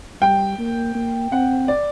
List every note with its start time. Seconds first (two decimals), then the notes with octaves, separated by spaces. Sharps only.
0.21 G3 G5
0.59 A#3
0.95 A#3
1.32 C4 F#5
1.68 D5